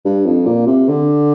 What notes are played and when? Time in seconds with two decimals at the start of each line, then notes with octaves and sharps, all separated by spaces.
0.05 G2
0.26 F2
0.46 A#2
0.67 C3
0.88 D3